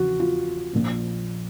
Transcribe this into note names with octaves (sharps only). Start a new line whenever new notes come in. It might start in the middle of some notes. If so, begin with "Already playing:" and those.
Already playing: E2 C#3 F3 F#4
F4
A#1 A#2 F3